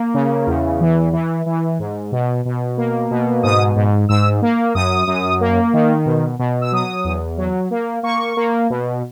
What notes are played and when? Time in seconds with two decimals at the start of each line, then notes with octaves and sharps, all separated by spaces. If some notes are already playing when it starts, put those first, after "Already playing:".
Already playing: A#3
0.14 C#3
0.47 E2
0.81 E3
1.13 E3
1.46 E3
1.79 G#2
2.12 B2
2.45 B2
2.77 A#3
3.11 B2
3.43 G#2 D#6
3.76 G#2
4.09 G#2 E6
4.42 A#3
4.75 F#2 D#6
5.07 F#2
5.41 A#3
5.73 D#3
6.06 B2
6.39 B2
6.61 E6
6.72 F#3 D#6
7.04 E2
7.38 F#3
7.71 A#3
8.03 A#3 C#6
8.37 A#3
8.70 B2